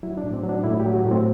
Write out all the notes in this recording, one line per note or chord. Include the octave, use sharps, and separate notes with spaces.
F#3 E4
D4
A2
C4
F#3
D4
A2 E4
G4
F#3
F#4
A2
C4